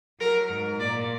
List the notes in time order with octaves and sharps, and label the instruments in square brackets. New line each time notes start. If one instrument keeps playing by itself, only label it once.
[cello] F#3 [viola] A#4
[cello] G#2
[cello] A#2 [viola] D5